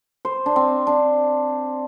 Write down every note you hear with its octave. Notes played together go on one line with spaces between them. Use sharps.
C5
D4
C4
D4